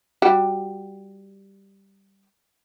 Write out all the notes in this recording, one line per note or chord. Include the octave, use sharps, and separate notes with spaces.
G3 F#4 G4